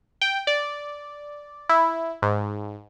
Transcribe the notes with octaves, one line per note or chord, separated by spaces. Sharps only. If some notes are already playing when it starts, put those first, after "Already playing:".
G5
D5
E4
G#2